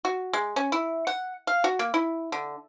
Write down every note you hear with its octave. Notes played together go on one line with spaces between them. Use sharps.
F#4
G#3
C#4
E4
F#5
F5
F#4
A#3
E4
D3